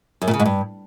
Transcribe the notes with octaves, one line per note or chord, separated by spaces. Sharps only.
F#2
A#2
C#3
G#2
G2